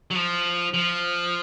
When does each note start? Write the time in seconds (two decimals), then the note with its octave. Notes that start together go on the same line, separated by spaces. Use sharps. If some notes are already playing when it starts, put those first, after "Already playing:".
0.11 F#3
0.15 F3
0.74 F3